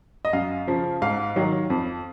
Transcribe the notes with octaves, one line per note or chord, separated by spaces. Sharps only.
D#5
F#2 F5
C#3 F3
G#2 F5
D#3 F#3
F2